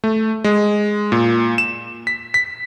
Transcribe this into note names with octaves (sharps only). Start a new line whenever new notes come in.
A3
G#3
A#2
E7
B6
B6